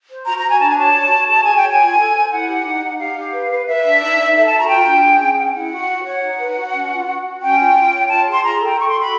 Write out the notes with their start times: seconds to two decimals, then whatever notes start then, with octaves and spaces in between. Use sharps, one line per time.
0.09 C5
0.26 F#4 A#5
0.38 A#5
0.43 F#4
0.49 G#5
0.60 D4 A5
0.69 G#5
0.77 C#5 A5
0.94 F#4
1.12 F#4
1.28 G#4 A5
1.42 G#4 G#5
1.55 G5
1.62 C#5
1.69 G#5
1.80 F4
1.97 A4
2.13 C5
2.31 E4 F#5
2.47 G4
2.64 D#4
2.82 D#4
2.99 G4 F5
3.16 G4
3.33 B4
3.50 B4
3.67 B4 E5
3.84 D4
4.01 D#4
4.18 D#4
4.35 A4 E5
4.47 F#4 A5
4.58 A#5
4.68 F4 G5
4.85 D4
5.03 G#4
5.20 C#4
5.37 G#4 F#5
5.45 G5
5.53 E4 F#5
5.71 F#4
5.88 F#4
6.05 C#5 F#5
6.22 D#4
6.38 B4
6.56 F#4
6.73 C#4
6.90 F4
7.07 F#4
7.24 F#4
7.41 C#4 G5
7.58 F4
7.75 F4
7.92 C#5
8.09 F4 A5
8.26 G#4
8.32 C6
8.43 F4 A#5
8.60 A4
8.66 G5
8.78 A4 C#6
8.88 C6
8.94 F#4
9.00 B5